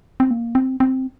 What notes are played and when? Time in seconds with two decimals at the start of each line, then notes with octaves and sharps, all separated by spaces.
0.20 C4
0.31 A#3
0.55 C4
0.80 C4